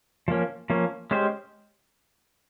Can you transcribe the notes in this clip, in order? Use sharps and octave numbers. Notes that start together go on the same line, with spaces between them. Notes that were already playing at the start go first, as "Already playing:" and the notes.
F3 A#3 C#4
F3 A#3 C#4
G#3 C#4 G4 C5